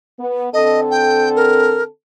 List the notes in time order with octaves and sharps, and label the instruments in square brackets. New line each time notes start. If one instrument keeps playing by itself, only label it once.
[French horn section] B3
[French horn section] D3 C4 A4 [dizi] D#5
[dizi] G5
A#4